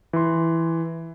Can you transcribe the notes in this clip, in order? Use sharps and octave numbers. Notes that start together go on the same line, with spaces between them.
E3 C6